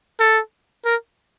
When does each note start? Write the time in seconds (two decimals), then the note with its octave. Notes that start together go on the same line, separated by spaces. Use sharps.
0.20 A4
0.85 A#4